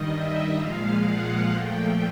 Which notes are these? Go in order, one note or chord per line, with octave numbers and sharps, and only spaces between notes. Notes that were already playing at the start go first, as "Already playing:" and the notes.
Already playing: G2 D#3 G3 D#5
E5
A#2 F3 G#3 F5
F#5
A#2 F3 A3 G5